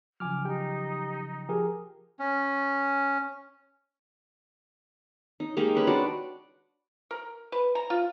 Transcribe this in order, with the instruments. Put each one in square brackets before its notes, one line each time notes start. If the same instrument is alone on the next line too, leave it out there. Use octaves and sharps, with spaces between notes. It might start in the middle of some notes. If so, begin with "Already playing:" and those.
[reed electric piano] C#3 F3 F#3 [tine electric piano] G#5 D6 F6
[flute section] D#4 [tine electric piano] G4 G5
[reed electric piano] F3 [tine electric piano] G4 G#4 A#4
[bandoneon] C#4
[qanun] D#4
G#3 A#3 D#4 G4
C#4 B4 B5
D4 F#4 D5
[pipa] A#4
B4
A#5
F4